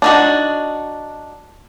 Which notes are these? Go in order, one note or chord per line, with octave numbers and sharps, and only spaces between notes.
D4 D#4 F#4